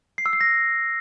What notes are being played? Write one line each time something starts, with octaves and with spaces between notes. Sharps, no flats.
C7
E6
C7
A#6